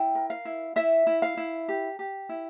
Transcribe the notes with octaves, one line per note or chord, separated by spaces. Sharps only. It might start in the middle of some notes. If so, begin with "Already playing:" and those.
Already playing: E4 G5
A#4
F5
E4
E4 E5
E4
F5
E4
G4
G4
E4